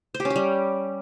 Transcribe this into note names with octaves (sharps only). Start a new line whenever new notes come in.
C5
G4
C#4
G4
G3